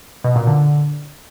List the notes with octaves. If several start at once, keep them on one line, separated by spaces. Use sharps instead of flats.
B2
A#2
D3